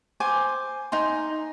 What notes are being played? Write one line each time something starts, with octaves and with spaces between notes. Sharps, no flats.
C5 G#5 D6
D#4 G#5 C6